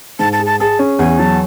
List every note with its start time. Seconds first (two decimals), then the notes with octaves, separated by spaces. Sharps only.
0.19 G#2 A5
0.33 A5
0.39 G#4
0.46 A5
0.60 G#4 A5
0.79 C#4
0.99 E2 G#5
1.19 F#3 A5